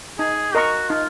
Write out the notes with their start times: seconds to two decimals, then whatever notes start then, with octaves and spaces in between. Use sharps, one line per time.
0.18 D#4 G#4
0.54 F#4 A#4 D#5 A#5 C#6
0.90 D#4 F4